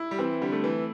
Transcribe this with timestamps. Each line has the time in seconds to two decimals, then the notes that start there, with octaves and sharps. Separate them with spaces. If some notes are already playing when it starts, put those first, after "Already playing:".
Already playing: E4
0.11 G3
0.19 E3 C4
0.41 D3 G3
0.52 A3
0.64 E3